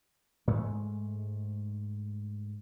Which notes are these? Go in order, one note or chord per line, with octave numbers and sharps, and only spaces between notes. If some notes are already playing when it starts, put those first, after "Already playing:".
G#2 G#3 A3